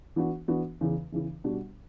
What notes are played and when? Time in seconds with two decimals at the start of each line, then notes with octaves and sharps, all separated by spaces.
0.16 E3 B3 D4 F#4
0.48 E3 B3 D4 F#4
0.81 E2 C#3 E3
1.12 E2 C#3 E3
1.44 B2 G3 D4 F#4